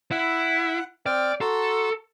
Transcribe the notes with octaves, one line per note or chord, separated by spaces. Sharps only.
E4 F#5
C4 D5 G5 F6
F#4 A4 A#5 C6